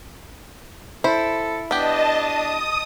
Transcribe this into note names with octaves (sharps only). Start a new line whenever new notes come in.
E4 A4 C5
B3 D4 G4 D#5 A5
D#6